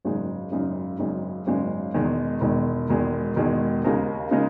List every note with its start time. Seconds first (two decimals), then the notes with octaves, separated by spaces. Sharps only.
0.05 G#1 F#2 C#3 G#3 D#4
0.52 G#1 F#2 C#3 G#3 D#4
0.99 G#1 F#2 C#3 G#3 D#4
1.47 G#1 F#2 C#3 G#3 D#4
1.94 E1 E2 D#3 G#3
2.41 E1 E2 D#3 G#3
2.89 E1 E2 D#3 G#3
3.36 E1 E2 D#3 G#3
3.84 D#2 C#3 G#3 D#4 A#4
4.31 C#3 G#3 D#4 A#4